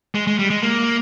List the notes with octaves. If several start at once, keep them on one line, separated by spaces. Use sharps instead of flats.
G#3
G#3
G3
G#3
A#3